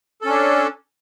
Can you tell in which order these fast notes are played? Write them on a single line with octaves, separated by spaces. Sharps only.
A4 C#4 D4